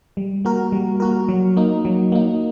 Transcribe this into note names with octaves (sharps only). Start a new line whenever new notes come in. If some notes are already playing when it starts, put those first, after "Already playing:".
G3
A#3 F#4 A#4
G3
A#3 F#4 A#4
F#3
A#3 D#4
F#3
A#3 D#4